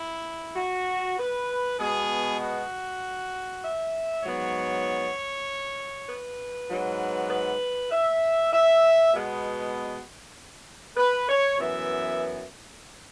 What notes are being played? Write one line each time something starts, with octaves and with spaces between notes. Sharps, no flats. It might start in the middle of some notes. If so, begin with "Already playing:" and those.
Already playing: E4
F#4
B4
B2 G#3 B3 G#4
F#4
E5
G#2 F#3 B3 C#5
B4
G#2 F#3 B3
B4
E5
E5
B2 G#3 B3
B4
C#5
F#2 E3 B3 E5